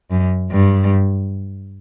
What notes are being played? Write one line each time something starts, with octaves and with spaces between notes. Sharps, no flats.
F#2
G2